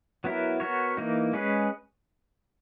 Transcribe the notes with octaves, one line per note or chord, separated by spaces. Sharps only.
F#3 B3 E4 A#4
B3 F#4 A#4 C#5
E3 A#3 D#4
G#3 C#4 G#4 B4